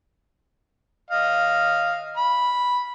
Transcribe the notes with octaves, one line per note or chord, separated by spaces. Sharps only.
D#5 F5
B5